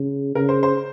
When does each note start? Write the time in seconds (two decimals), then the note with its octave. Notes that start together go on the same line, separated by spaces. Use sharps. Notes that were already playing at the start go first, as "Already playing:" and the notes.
Already playing: C#3
0.35 C#3 A#4
0.49 C5
0.63 C5